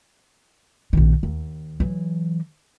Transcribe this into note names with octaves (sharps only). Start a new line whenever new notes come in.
A#1 D#3
D#2
E3 F#3